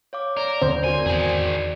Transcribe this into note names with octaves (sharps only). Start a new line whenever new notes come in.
C#5 F5 D6
A#4 D5
D#2 D3 C4 C5
F#4 A#4 D5 G#5
E2 D#3 G#4